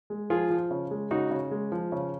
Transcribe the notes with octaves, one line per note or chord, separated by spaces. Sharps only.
G#3
F3 F4 G#4
F3
C#3
G#3
C#3 D#4 F#4
C#3
G#3
F3
C#3